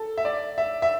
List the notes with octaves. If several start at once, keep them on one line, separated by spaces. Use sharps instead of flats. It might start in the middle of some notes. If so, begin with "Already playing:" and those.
Already playing: A4
E5
D5
E5
E5